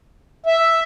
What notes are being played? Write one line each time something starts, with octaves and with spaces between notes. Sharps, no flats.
E5